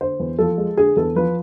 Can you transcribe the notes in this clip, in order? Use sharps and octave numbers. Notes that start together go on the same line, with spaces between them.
D3 C5
E2
F3 A4
G#3
D3 G#4
E2 A4
F3 B4